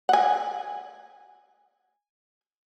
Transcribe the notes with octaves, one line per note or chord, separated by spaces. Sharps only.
F#5 G#5